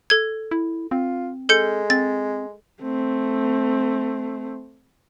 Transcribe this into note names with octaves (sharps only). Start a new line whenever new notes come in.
A4 G#6
E4
C4 F4
G#3 A4 G6 C#7
C4 A6
A3 C4